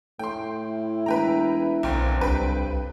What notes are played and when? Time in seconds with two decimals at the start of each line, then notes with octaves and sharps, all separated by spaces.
0.19 A2 G5 C6
0.69 E4
1.06 E1 B4 G5 A#5
1.83 F#1 B1 A#2 D3 F3 C4 G5
2.21 C2 G2 B4 G5